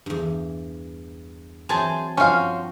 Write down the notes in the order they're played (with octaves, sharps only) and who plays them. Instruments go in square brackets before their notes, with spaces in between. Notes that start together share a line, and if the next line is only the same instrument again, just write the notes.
[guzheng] E2 G2
[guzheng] E3 F#3 C4 [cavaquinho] G#4 C5 A5
[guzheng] G2 F3 D4 [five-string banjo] C#4 F5 [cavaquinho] F#4 C5 G5